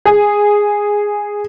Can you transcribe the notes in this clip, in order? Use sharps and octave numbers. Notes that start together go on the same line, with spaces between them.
G#4